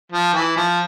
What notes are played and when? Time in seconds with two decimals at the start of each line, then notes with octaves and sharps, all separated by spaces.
0.12 F3
0.34 E3
0.56 F3